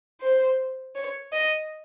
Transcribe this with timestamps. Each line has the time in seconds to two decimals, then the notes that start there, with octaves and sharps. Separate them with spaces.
0.21 C5
0.95 C#5
1.32 D#5